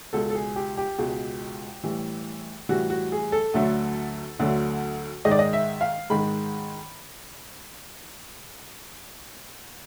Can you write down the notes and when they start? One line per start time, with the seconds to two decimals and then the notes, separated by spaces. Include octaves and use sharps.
0.13 C#2 B2 G#3 A4
0.30 A4
0.35 G#4
0.56 G4
0.77 G4
0.98 C#2 B2 G#3
1.83 A2 E3 G3
2.69 A2 E3 G3 F#4
2.90 F#4
3.12 G#4
3.32 A4
3.54 D2 D3 F#3 A3
4.39 D2 D3 F#3 A3
5.25 G#2 D#3 G#3 D#5
5.31 D5
5.39 D#5
5.53 E5
5.81 F5
6.10 G#2 D#3 G#3 B5